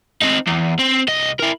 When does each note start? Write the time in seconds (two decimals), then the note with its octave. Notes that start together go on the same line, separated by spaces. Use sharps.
0.22 C4 D#4
0.47 E2
0.79 C4
1.08 C2 D#5
1.40 E4 A#4